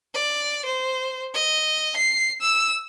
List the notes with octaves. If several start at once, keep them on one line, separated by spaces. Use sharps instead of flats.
D5
C5
D#5
C7
E6